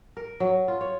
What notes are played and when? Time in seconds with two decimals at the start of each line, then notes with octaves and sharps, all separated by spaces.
0.17 A#4
0.40 F#3
0.68 F4
0.81 C#5